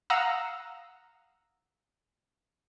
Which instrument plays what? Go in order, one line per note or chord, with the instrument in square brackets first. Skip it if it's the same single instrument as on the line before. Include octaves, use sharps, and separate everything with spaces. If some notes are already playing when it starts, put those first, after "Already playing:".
[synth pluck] F5 F#5 A#5 D#6 E6